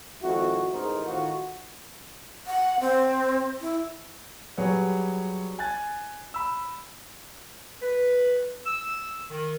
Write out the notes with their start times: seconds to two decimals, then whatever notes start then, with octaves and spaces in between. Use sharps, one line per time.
0.21 G#1 F2 E4 F#4
0.71 A1 E2 G#2 D#4 A#4 C5
1.06 A2 D#3 F4 F#4
2.47 F#5
2.80 C4
3.61 E4
4.57 F#3 G3 F#4 G#4 B4 C#5
5.59 G#5 F#6 A6
6.34 B5 E6
7.82 B4
8.66 E6
9.30 D#3